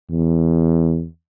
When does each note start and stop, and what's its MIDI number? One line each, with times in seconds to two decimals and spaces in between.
0.11 1.06 40